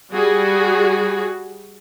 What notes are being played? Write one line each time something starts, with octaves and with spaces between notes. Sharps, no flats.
G3 F#4 G#4